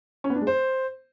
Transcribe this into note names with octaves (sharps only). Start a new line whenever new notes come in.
C#4
B3
D4
G#3
C5